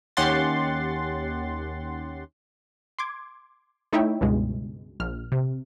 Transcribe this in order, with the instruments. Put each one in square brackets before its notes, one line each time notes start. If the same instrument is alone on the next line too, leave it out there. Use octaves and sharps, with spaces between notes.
[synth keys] D#2 C#4 G4 F#5 C6 A6
[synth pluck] C6 D6 G#6
A3 D#4 E4 C#5 E5 G5
C#2 G2 B2 G#3
A#1 F6
C3